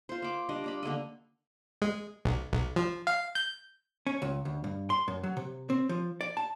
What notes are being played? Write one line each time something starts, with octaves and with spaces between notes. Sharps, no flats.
F4 C5
A#3 D6
G3 D4 D#5
A#3 D5 B5
D3 A#3 A4 D#5
G#3
B1
B1
F3
F5
G6
C#4
C#2
D2
G2
C6
F#2
F#3
C3
C4
F3
D5
A5